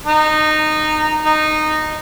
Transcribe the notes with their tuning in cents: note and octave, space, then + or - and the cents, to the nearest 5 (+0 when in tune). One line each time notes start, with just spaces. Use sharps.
D#4 -15
D#4 -15